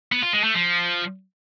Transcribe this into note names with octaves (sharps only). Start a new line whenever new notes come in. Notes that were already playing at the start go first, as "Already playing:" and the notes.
B3
F4
G#3
A3
F3